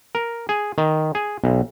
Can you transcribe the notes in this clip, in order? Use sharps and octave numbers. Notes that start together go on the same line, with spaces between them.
A#4
G#4
D#3
G#4
B1